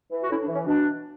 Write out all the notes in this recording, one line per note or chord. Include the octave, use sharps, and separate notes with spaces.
E3
F#4
A2 C#4 E4
D4
E3
C#4
B2 D4